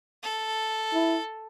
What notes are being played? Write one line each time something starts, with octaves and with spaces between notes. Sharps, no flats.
A4
E4